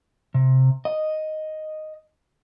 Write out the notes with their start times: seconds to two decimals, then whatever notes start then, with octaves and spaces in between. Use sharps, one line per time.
0.34 C3
0.85 D#5